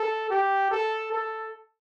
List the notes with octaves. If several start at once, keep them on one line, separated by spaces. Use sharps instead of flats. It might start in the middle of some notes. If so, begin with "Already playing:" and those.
Already playing: A4
G4
A4
A4